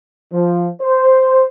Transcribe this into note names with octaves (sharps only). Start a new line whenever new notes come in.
F3
C5